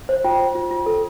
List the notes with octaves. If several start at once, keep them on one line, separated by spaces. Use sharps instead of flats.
C5
F4 G5
C5
F4
F4
A4